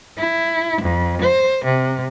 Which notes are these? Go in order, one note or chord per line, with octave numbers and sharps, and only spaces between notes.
E4
F2
C5
C3